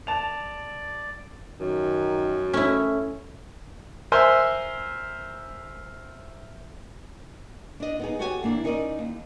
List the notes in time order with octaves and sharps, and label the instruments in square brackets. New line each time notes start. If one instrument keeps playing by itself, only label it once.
[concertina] D5 [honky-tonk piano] A5 F7
[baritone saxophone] F#2 [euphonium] D#3
[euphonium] A3 [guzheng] C#4 E4
[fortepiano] A#4 C5 E5 G#5 C6
[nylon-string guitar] D4 D#5
B3 D#4 G#4
F#4 G4 A4 C#5 F#5 G#5
E3 A#3 D4 E4
C#4 D#4 A#4 D5 D#5
D#2